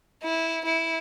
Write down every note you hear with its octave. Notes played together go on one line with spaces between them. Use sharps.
E4
E4